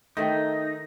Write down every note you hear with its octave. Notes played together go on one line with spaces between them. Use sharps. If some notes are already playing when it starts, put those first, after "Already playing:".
D#3 A3 D#4 E5 F#5